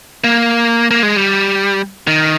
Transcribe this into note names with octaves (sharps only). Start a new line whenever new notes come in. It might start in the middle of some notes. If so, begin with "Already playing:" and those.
A#3
A#3
G#3
G3
D#3